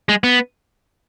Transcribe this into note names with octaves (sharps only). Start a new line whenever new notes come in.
G#3
B3